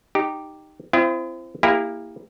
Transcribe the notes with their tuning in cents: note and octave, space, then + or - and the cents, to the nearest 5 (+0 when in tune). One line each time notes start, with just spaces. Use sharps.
D#4 -10 G4 +0
C4 +0 E4 +45 D#5 +15
A#3 +0 E4 +0 G4 +35